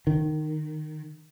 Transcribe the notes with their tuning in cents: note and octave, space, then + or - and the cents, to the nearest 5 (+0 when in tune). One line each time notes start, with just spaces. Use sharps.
D#3 -15